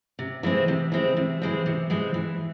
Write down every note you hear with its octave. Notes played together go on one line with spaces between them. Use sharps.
C3
E3 G#3 C4
C3
E3 G#3 C4
C3
E3 G#3 C4
C3
E3 G#3 C4
E3